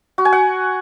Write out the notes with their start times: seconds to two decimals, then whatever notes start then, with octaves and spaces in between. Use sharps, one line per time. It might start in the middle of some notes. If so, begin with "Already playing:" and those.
0.18 F#4
0.25 G#5
0.33 F#5